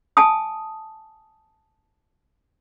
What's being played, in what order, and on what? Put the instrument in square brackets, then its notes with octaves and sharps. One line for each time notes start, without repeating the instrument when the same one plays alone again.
[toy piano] G#5 A5 D#6